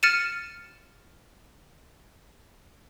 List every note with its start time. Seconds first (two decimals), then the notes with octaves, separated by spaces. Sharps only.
0.03 F6 A6 C#7 D#7 E7